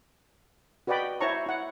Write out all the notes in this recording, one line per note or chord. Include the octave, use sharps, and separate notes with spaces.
F#4 B4 D5 D#5 G5 B5
E4 C5 C#5 A5 A#5 C#6
E4 F#5